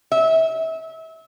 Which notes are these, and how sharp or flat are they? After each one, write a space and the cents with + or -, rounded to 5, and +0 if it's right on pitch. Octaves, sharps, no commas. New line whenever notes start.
E5 -30